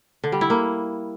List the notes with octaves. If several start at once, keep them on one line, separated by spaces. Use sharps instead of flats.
D3
G3
E4
A#3